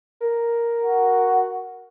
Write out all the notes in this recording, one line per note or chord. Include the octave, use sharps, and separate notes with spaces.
A#4
F#4